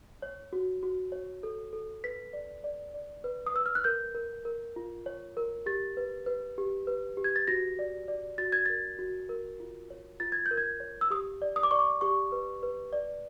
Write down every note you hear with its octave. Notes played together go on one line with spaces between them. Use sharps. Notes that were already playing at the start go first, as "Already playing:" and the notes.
C#5
F#4
F#4
C#5
A4
A4
B4 B6
D5
D5
D5
B4
D#6
B4 E6
F6
F#6
A#4 G6
A#4
A#4
F4
C#5
A#4
G4 A6
B4
B4
G4
B4
G4
G#6
A6
F#4 A#6
D5
D5
F#4 A6
G#6
A#4 A6
F#4
A#4
F4
C#5
F4 A6
G#6
G6
A#4
G#6
C#5
E6
G4 D#6
D5
D#6
D6
D5 C#6
D6
G4 C#6
B4
B4
D5